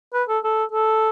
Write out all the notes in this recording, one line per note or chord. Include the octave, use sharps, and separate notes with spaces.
B4
A4
A4
A4